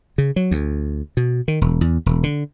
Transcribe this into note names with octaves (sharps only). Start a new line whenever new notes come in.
C#3
F#3
D2
B2
D#3
E1
E2
E1
D3